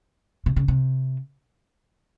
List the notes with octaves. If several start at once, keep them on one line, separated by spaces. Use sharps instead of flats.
C3
C#3
C3